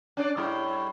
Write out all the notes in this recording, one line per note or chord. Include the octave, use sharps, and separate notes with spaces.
C#4 D4 D5
A2 G3 E4